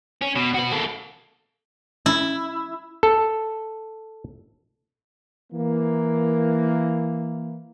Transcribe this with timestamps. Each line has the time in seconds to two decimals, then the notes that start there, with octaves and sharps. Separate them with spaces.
0.21 C#4
0.35 B2
0.54 F#4 B4
0.72 A#3 A4
2.06 E4
3.03 A4
5.53 E3 A#3